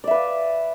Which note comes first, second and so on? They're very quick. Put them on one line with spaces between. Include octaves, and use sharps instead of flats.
D5 E5 B4 F5